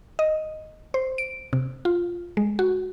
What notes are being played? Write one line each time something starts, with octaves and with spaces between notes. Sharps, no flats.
D#5
C5
D7
C3
F4
G#3
F#4